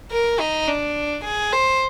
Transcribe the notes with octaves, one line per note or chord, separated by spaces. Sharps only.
A#4
D#4
D4
G#4
C5